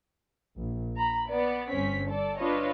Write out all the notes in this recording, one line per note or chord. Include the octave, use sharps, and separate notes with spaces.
A#1
A#5 B5
B3 D5
G1 C4 C#4 B6
A4 D5 A5
D4 F4 B4 C#5 D#5